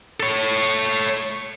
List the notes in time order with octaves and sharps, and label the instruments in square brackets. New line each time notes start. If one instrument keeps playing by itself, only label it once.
[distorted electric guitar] A4 C#5